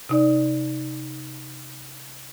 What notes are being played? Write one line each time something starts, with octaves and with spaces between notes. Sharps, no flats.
C3 D#4 D5